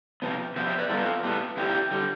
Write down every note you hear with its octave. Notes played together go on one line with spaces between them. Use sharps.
C3 F3 B3
C3 F3 B3 C5 E5
C5 E5
B4 D5
A2 G3 B3 F4 A4
A2 G3 B3
E2 D3 G3 E4 G4
D3 G3